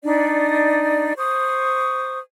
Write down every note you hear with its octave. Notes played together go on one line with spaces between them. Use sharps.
D4 D#4 D5
C5 C#6 D#6